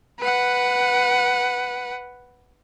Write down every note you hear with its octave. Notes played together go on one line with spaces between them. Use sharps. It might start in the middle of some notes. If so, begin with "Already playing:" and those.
B4 F#5